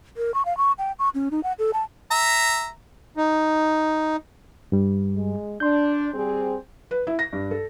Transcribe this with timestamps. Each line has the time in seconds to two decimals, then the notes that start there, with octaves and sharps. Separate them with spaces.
0.17 A#4
0.34 C#6
0.45 F5
0.57 C#6
0.78 G5
0.99 C#6
1.14 C#4
1.31 D#4
1.43 F#5
1.59 A4
1.73 A5
2.11 E5 A#5
3.17 D#4
4.72 G2 G3
5.15 G#3
5.60 D4 C6 G6
6.13 G3 C4 G#4
6.91 B4
7.07 E4
7.19 A#6
7.33 G2
7.51 A4